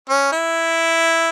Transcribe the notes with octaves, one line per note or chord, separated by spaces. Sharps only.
C#4
E4